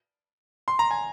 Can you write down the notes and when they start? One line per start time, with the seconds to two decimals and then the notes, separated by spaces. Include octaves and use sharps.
0.68 C6
0.79 A#5
0.91 G#5